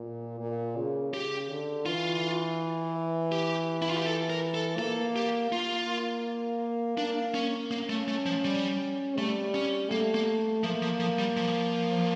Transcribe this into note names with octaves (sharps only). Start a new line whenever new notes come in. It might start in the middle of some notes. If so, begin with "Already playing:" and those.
Already playing: A#2
A#2
C#3
C#3 G4
D3
E3 F4
G4
E4
F4
G4
A4
A#4
A4
A#3 A4
G4
A#3 F4
A#3 D4
C#4
A#3 C#4
A3
A3
F3
G3
G3 A3
C#4
A3 A#3
A#3
F3 A#3
F3
F3
G3
F3